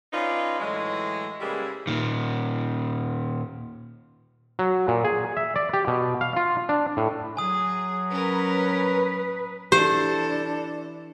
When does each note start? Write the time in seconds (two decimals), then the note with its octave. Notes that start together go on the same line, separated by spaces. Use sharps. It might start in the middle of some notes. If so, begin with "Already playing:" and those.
0.13 C#4 D#4 F4 B4 D5
0.60 A2 E3 F#3 G#3
1.40 C#3 G3 G#3 A#3 B3 E4
1.87 A#2 D#3
4.59 F#3
4.88 A#2
5.04 G#4
5.37 E5
5.56 D5
5.73 G4
5.87 B2
6.21 F5
6.36 F4
6.69 D4
6.97 A2
7.37 F#3 G#4 G#5 D#6
8.11 C#4 A#4 B4
9.72 E3 D4 G4 A4 C5